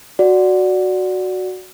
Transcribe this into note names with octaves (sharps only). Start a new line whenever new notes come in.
F#4 D5